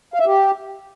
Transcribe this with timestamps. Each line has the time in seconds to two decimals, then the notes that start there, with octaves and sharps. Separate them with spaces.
0.14 F5
0.20 E5
0.26 G4